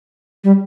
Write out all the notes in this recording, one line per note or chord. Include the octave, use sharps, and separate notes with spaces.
G3